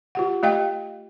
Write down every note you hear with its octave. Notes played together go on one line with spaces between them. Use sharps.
F4 G4 F#5
A3 G4 D#5 F5 G5